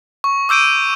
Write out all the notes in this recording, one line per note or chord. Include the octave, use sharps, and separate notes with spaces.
C#6
D6 E6 G6 D7 D#7